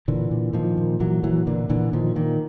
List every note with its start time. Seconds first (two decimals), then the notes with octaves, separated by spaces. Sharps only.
0.08 A#2 D3 E3
0.31 A#2
0.53 A#2 D#3 F3
0.77 A#2
1.00 A#2 E3 F#3
1.23 A#2 E3 F#3
1.47 A#2 D3 E3
1.70 A#2 D3 E3
1.93 A#2 D#3 F3
2.16 A#2 D#3